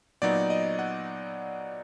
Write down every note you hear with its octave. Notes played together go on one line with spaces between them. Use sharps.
A#2 F#3 B3 D#4 D5
D#5
F#5